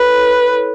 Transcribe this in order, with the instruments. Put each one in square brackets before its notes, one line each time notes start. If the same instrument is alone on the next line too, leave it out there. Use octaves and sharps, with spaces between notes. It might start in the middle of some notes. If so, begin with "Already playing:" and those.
Already playing: [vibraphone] E4 A4 C#5 [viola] B4